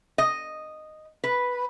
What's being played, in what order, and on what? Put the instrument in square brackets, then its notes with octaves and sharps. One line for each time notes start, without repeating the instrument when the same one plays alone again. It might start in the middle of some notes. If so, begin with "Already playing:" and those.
[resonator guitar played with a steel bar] D#5
B4